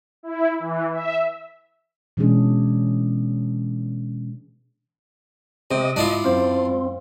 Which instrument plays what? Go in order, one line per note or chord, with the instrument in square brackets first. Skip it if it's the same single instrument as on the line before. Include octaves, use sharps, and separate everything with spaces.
[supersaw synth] E4
E3
E5
[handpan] B2 E3 G#3 C#4 D4 G#4
[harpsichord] C3 [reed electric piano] C4 [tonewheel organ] D#5
[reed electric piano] G#2 [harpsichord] D4 E4 F4
[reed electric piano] F#2 C5 F5 [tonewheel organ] C4